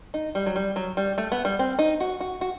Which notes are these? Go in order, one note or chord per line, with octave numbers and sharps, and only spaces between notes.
D#4
G3
F#3
G3
F#3
G3
A3
B3
G3
C4
D#4
F#4
F#4
F#4